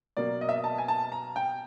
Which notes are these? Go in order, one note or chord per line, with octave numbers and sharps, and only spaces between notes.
B2 F#3 A#3 D5
D#5
E5
D#5
A5
G#5
A5
A#5
G5